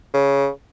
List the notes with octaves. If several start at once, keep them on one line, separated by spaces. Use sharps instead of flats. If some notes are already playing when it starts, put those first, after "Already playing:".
C#3